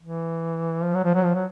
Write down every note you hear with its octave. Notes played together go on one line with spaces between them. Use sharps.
E3
F3
F#3
F3
F#3
F3
F#3